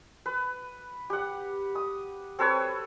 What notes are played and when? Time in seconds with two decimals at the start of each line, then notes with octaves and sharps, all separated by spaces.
0.26 B4
1.10 G4 F#5
1.75 D#6
2.39 C4 A4 B4 C#5